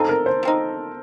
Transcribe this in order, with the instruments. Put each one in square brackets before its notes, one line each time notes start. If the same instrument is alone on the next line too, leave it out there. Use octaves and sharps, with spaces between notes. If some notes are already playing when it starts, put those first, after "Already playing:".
Already playing: [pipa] F3 C4 D#4 [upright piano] A4
[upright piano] A#4
C5
[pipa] F3 C4 D#4